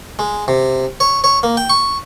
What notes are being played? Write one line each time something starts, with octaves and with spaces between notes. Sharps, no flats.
G#3
C3
C#5
C#5
A#3
G5
C#6